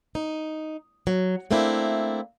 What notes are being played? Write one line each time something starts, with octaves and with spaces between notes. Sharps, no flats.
D#4
F#3
A3 A#3 C4 D4 E4